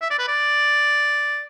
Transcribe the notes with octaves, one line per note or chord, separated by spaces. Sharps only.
E5
D5
B4
D5